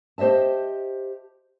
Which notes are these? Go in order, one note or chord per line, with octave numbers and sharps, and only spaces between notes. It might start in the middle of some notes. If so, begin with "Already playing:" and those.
G4 C5 D#5 E5 A5